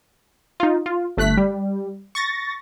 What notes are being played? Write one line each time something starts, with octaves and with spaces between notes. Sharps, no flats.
D#4 F4
F4
G1 A3 F#6 B6
G3
C#6 A6 A#6